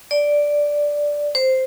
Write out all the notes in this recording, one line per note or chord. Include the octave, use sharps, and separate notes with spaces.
D5
C5